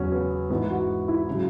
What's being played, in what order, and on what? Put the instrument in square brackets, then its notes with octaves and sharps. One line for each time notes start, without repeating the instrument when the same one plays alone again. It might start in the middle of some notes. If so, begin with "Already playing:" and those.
Already playing: [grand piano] E2 C#3 F#3 C#4
B3
G#2 E3 B3
F#4
E4
C#3 F#3